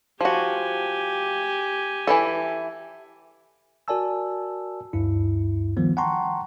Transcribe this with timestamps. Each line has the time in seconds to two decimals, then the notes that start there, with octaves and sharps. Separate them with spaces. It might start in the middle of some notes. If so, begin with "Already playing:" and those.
0.21 F3 F#4 G4 G#5
2.07 E3 E4 A4
3.88 F#4 A#4 D5 G#5 A5 E6
4.93 D2 G2 E4
5.77 D#3 F3 G3 B3
5.97 F#5 G5 A5 A#5 C6 C#6